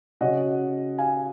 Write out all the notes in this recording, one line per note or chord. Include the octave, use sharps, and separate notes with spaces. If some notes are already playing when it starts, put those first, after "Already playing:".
C#3 F#3 C#4 D#5 F#5
F5 G#5